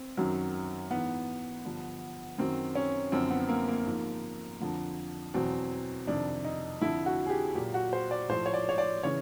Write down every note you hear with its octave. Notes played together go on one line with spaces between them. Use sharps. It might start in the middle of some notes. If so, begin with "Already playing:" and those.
Already playing: C4
F#2 D#3 F#3
G#2 E3 B3
G2 D3 F3
F#2 D#3 F#3 C4
C#4
F#2 D3 F3 C4
B3
A#3
A#3
G#2 F3
F2 D3 F3
E2 B2 F#3 C4
F2 C3 D#3 D4
D#4
F2 D3 F3 E4
F#4
G#4
G4
A#2 F#3 G4
F#4
C5
D5
A2 F3 C5
C#5
D5
C#5
D5
C#3 E3 C#5